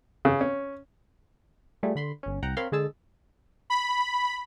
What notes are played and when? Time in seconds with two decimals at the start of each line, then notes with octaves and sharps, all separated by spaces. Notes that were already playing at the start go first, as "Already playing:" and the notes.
0.25 C#3
0.41 C#4
1.83 G3 A3 F4 G#4
1.95 D3 B5 C6
2.23 G1 C#4
2.43 C2 F#5 G5 A#5
2.57 C4 A#4 C#5 F5 B5 C6
2.72 D3 G#3 G#4 A5 E6
3.70 B5